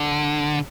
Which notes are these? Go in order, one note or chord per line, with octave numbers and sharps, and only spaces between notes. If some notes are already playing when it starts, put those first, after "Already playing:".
Already playing: D3